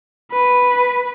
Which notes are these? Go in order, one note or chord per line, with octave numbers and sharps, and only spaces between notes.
B4